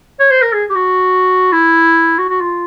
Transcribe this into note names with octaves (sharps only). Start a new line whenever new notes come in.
C#5
C5
A#4
G#4
G4
F#4
E4
F#4
F#4
F4